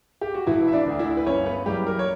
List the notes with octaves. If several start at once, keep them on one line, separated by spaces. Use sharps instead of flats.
G4
F#4
E1 E3 E4
E5
D4 D5
D2 D3
E4 E5
B4
G1 C#4 C#5
B3 B4
F#2 E3 G3 G4
A#3 A#4
C#5